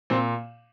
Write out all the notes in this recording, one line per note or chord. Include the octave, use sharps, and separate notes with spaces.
A#2 C4